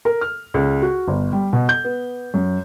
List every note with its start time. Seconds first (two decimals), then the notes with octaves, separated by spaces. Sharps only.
0.05 A#4
0.21 F6
0.54 C#2
0.82 F#4
1.08 G1
1.32 G3
1.53 B2
1.69 G6
1.85 B3
2.34 F#2